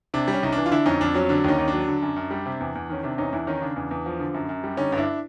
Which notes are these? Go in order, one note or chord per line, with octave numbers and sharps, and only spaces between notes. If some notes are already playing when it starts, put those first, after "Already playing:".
C3 D4
G3
C#4
C2 D#4
D4
E3
F4
D3 D4 E4
F2 C#4 D#4
F2 D4
F#3 C#4
D3 D4
D#2 C#4 D#4
D#2
D4
F#3
D3
F#2
F#2
G3
C3
E2
E2
D#3 C#4
C3 D4
E2 C#4 D#4
E2 D4 E4
D#3 C#4 D#4
C#3 D4
E2
E2
F3
D3
F#2
F#2
G3
D3 C#4 D#4
G2
D4 E4